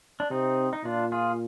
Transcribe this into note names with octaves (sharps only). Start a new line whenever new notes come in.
D4
C3 C4 D#4
D#4
A#2 D4 F4
F4 G#4